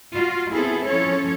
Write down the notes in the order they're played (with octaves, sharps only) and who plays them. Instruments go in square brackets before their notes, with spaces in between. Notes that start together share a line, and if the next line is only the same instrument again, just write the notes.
[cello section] F4 F#4
B3 C4 E4 G#4 A4
F3 C#4 A4 C#5